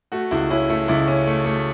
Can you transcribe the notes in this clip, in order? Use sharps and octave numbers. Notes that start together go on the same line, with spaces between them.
A3 F#4
C#2 E4
C#4 E4
A3 E4
C#2 E4
C#4
A3
A3